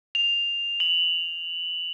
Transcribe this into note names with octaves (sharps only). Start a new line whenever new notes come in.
F7
F#7